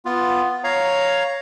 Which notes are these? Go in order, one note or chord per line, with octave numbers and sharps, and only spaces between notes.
B3 F4
C#5 F5 A#5